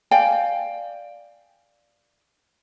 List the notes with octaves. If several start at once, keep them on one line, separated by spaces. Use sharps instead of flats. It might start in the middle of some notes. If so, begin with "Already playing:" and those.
D5 F5 G5 G#5